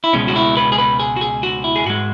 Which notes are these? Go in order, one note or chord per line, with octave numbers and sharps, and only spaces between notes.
E4
C#2 B2 G#3 C#4
F#4
E4
B4
G#4
B4
G#4
F#4
G#4
F#4
E4
G#4
G#2 G#3 F#4